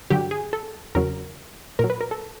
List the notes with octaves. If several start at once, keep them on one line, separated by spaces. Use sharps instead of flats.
G2 D3 F#3 G4
G#4
A4
E2 C#3 F#3 A#4
A#2 F#3 A#4
B4
A#4
A4